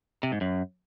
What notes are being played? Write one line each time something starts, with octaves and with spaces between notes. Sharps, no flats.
C3
G#2
F#2